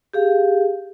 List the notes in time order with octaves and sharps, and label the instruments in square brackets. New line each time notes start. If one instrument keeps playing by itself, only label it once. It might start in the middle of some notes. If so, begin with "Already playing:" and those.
[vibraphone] G4 G#4 F5